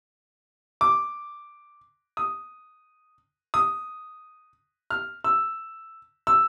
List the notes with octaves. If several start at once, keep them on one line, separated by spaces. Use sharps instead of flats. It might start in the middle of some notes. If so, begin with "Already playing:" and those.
D6
D#6
D#6
F6
E6
E6